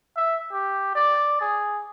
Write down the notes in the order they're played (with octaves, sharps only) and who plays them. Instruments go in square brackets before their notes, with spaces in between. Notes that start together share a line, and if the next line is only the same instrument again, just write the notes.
[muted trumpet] E5
G4
D5
G#4